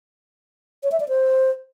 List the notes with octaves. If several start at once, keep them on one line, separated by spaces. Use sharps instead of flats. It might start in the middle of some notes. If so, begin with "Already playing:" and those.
C#5
E5
D5
C5